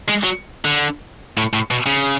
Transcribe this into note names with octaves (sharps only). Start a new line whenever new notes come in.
G#3
F#3
D3
A2
A2
B2
C#3